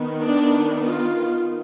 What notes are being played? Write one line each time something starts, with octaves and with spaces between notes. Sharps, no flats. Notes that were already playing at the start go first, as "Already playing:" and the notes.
Already playing: D#3 B3
D4
F4